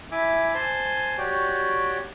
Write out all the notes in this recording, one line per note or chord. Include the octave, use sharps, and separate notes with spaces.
E4 E5 G#5 D6
C5 G#5 A5 C6
F#4 G4 C#5 D5 G5